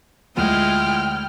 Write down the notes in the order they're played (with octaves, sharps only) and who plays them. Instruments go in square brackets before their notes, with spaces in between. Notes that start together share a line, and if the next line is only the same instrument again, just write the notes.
[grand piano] D2 [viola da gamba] G#3 E4 F4 [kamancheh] G5 F6